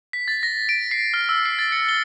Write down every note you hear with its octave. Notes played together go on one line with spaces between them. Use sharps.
B6
A6
A#6
D7
C7
F6
E6
C7
A6
C#7
G7